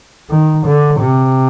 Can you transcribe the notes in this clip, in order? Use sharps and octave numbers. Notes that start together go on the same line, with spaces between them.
D#3
D3
C3